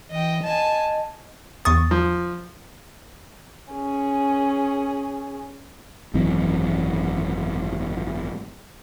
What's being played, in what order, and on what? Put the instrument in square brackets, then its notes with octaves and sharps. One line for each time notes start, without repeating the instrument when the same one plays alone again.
[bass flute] E3 [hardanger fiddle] D#5 G5
[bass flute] D#5 [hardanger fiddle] G#5 A5
[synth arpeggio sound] E2 C#6 A6 [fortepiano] D#6
[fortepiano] F3
[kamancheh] C#4 G#4
[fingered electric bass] G#1 F#2 E3 C4